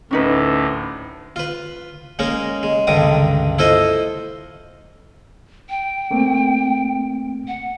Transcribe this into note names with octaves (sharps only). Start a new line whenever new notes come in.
D2 A2 C#4 D#4 B4
F4 B4
G#3 A#3 C#4 D#4
G#3
C#2 G2 D3 D#3 D6 D#6
E4 F4 A4 C5 D#5
G5
A3 A#3 C4
F#5